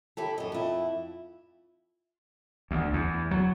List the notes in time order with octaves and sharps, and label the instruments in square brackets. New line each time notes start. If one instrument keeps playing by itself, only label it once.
[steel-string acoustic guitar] E4 G4 A4
F#2 D#5
F2 E4
[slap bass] D2
E2
F#3